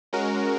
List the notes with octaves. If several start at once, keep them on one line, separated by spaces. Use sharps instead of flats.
G#3 C#4 F#4 A#4